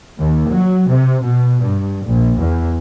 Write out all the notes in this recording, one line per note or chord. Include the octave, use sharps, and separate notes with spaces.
D#2
F#3
C3
B2
G2
A#1
E2